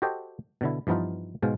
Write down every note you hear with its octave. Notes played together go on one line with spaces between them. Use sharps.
F#4 G4 A4 C5 D#5 G5
B2 D3 E4
G2 E3 F3 B3 D#4 F4
G#2 B2 G#3 C5 F5